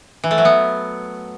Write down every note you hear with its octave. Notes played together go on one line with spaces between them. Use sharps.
E3
A3
F#3
B3